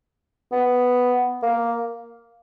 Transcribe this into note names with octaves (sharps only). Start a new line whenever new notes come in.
B3
A#3